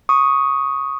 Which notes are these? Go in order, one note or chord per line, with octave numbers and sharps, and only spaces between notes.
C#6 D#6